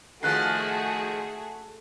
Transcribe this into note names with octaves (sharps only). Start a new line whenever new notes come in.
D#3 F3 A3 F#4 G#4 A4 F#6 C7